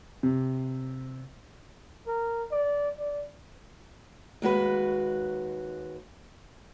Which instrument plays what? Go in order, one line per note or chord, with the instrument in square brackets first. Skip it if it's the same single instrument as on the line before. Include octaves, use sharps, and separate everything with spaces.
[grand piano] C3
[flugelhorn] A#4
D5
D5
[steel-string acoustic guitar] D#2 G#3 F#4 B4